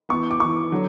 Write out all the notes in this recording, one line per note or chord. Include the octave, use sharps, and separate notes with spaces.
E3 B3 C#6
D6
E3 B3 C#6
D3 F#3